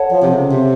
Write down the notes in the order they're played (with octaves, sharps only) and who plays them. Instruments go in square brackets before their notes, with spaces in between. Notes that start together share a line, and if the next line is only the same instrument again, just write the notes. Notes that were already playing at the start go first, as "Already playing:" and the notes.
Already playing: [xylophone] A4 C#5 F#5 A5
[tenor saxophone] F3
C3
C#3
C3